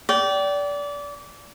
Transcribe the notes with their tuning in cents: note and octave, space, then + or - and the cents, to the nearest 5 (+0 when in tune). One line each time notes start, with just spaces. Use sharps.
D5 -25 G5 -25